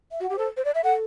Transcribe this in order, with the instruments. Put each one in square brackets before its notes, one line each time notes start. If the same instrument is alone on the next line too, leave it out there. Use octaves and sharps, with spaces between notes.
[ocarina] E5
[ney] F#4
[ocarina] F#5
[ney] G4
[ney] A4 [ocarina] C5
[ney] C5
D5
E5
[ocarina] A4 [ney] F#5